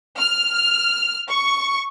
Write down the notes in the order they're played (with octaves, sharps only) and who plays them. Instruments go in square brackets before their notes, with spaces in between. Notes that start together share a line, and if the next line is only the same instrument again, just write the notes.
[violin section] F6
C#6